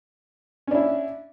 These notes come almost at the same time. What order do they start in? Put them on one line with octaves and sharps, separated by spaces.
C#4 D4 E4